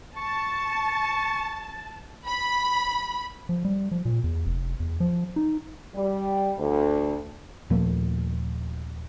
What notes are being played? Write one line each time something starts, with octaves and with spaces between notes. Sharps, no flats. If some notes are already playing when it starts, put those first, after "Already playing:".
A5 C#6
B5
F3
G3
F3
A#2
E2
F1
E2
F3
D#4
G3
D2
D#2 A#2 F3 A3